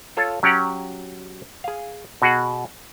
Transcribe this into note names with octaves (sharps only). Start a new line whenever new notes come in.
F4 A4 C#5 F5
F#3 C#4 G4 F#5 A#5
G#4 F5
B2 F#4 G#4 F#5